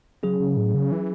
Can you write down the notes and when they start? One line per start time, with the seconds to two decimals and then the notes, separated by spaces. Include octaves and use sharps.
0.23 C#3 F#3 C#4 G#4
0.40 C#3
0.57 A2
0.74 C#3
0.92 E3